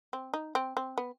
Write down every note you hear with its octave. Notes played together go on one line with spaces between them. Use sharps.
C4
D#4
C4
C4
B3